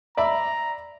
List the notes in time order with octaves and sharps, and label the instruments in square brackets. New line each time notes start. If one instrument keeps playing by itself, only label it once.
[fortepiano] D5 E5 B5 [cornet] A#5